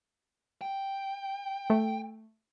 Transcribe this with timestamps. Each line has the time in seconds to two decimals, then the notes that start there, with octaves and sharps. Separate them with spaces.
0.61 G5
1.70 A3